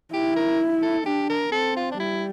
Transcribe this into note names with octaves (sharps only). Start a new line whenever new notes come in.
E4 G4
A#4
A4
D4 G4
A#4
C4 A4
F4
D4
G3 E4